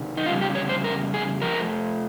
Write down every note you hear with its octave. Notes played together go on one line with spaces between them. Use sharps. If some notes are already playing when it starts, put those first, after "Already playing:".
Already playing: C3 D#3
D#4
F2 C#3 G3 F4
G4
C#5
C5
A#4
G#4
F2 C3 F3 A#4